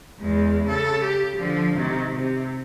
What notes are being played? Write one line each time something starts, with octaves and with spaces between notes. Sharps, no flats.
E2 G#3
C#3 A4
G4
D3 F3
C3 D#3
C3